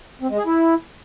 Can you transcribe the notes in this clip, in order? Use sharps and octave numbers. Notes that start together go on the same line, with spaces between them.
C4
G#3
G#4
E4